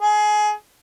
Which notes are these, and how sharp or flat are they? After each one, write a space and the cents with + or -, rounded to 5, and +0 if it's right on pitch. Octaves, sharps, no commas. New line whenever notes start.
G#4 +20